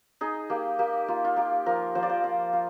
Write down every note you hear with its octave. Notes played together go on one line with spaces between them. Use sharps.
D#4 G#4
A#3 G4
A#3 G4
A#3 F4
F4
A#3 G4
F3 A#4
F3 C5
D5
C5
F4
F4